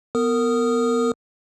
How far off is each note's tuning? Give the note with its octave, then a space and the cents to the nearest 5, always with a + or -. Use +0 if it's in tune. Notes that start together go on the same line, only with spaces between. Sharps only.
B3 +0 A#4 -25 D#6 -5